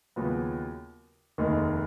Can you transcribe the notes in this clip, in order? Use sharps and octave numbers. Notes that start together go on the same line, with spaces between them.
D#2 C#3 F#3 B3 F4
F1 D#2 D#3 G#3